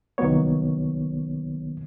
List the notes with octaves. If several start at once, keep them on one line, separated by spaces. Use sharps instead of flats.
C2 D#3 F#3 A#3 B3 C#5